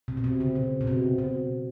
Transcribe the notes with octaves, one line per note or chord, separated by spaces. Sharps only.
C3
B2
C3
C#3
B2
B2
C3
B2